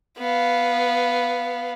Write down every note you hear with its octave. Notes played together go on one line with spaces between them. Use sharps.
B3 F5